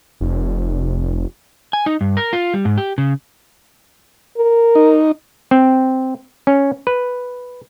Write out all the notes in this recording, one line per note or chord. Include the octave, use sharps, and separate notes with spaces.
F1
G#5
D#4
G2
A#4
F4
G3
G#2
G4
C#3
A#4
D#4
C4
C#4
B4